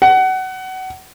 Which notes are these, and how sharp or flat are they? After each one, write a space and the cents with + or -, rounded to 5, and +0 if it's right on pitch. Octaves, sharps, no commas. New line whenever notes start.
F#5 +25